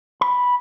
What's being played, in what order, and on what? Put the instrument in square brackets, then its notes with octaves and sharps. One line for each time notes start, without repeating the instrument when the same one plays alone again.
[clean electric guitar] B5